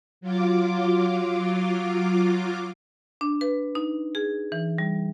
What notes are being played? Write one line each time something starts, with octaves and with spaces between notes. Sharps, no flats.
F#3 F4 D6
D4
B4
D#4
G#4
E3
G3